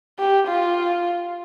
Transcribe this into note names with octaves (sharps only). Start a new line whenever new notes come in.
G4
F4